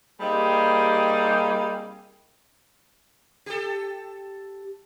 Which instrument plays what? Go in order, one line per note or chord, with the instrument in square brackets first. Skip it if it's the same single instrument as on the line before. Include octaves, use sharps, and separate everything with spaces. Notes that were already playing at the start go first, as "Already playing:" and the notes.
[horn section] G3 A#3 C4 D#4 G4 G#4
[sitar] G4 A4